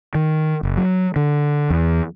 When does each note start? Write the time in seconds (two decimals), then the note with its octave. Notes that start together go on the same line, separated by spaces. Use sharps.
0.15 D#3
0.63 F#1
0.77 F#3
1.16 D3
1.70 E2